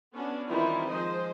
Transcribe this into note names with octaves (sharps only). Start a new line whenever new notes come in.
B3 C#4 D4 F#4
D#3 E3 G3 C4 E4 F4
F3 G#3 C5 D#5